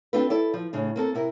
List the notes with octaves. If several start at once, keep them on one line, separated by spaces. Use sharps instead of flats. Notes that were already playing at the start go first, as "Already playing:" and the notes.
C4 D4 F4 A4 B4
E4 A4 D5
F3
A2 C#3 D4
A#3 C4 A4
C3 E4 A#4